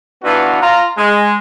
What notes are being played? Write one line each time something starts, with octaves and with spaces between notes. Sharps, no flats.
E3 B3 D4 F4 F#4
F4 A#5
G#3